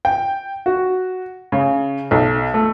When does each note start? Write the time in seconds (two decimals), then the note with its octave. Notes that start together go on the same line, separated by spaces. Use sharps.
0.05 G5
0.66 F#4
1.52 C#3
2.11 B1
2.54 A3